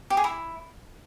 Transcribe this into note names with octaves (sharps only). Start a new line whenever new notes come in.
G4
G#4
E4